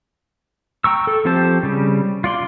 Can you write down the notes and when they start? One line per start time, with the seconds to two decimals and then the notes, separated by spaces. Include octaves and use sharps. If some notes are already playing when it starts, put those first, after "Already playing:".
0.84 G5 A#5 C#6 E6
1.07 A4
1.25 F3 C4 G4 C5 A5
1.63 C#3 G3
2.24 F4 D5 C6